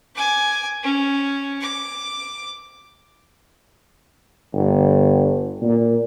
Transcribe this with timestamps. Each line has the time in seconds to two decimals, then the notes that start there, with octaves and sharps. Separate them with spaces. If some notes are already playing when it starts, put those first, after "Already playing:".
0.15 G#5 D6
0.83 C#4
1.61 D6
4.53 G1
5.62 A#2